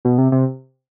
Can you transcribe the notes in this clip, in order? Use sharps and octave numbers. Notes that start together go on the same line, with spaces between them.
B2
C3
C3